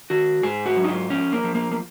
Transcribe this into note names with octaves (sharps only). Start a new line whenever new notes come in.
D#3 F#4
G#2 G#4
F#4
F#3
D#4
F4
F3 C#4
A#3
F3
A#3
A#3